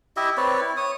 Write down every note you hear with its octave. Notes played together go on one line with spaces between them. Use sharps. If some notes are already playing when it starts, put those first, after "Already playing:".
E4 G4 D#5 E5
C4 B4 C#5 D5
E4
C#5 D#6